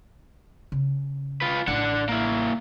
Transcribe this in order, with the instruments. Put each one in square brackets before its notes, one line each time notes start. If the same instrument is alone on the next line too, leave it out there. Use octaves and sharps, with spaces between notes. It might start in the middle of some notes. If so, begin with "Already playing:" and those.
[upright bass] C#3
[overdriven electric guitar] F4 B4
[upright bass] A1 [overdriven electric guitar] D4 F#5
[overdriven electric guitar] A#3 E4